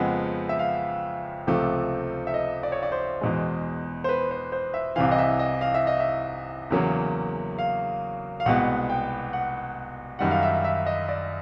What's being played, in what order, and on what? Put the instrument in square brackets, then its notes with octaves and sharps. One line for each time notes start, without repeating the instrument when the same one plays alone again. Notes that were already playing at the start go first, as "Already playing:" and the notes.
Already playing: [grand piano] F2 C#3 F3 G#3 B3 F#5
E5
F5
C#2 C3 F3 A3
E5
D#5
D5
C#5
D5
C5
E2 B2 G#3
C5
B4
C5
C5
E5
C2 C3 E3 F5
D#5
E5
D#5
F5
E5
D#5
E5
E2 C#3 F#3 A#3
F5
F5
C2 B2 G#3 B3 F#5
G5
F#5
F#2 D#3 G3 F#5
F5
E5
E5
D#5
D5